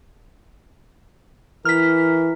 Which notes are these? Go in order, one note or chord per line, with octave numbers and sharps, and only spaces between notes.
E3 A#4 F6 B6